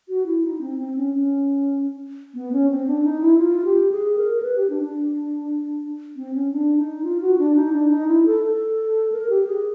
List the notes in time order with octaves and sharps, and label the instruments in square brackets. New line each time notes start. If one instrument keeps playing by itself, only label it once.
[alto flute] F#4
E4
D#4
C4
C4
C#4
C#4
B3
C#4
C4
D4
D#4
E4
F4
G4
G#4
A#4
A#4
B4
G4
D4
D4
C4
C#4
D4
D#4
F4
F#4
D4
D#4
D4
D#4
E4
A4
A4
A#4
G4
G#4